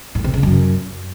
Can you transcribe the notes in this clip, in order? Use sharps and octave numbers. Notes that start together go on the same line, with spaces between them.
A2
C3
C#3
F#2